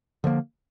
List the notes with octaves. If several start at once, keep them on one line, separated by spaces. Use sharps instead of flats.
D3 F3 A#3